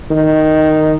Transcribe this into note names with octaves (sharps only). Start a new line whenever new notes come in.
D#3